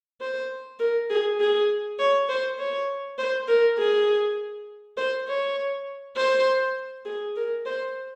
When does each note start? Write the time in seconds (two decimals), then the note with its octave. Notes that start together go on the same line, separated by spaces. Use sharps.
0.21 C5
0.79 A#4
1.10 G#4
1.40 G#4
2.00 C#5
2.30 C5
2.59 C#5
3.18 C5
3.48 A#4
3.78 G#4
4.97 C5
5.28 C#5
6.17 C5
7.06 G#4
7.36 A#4
7.66 C5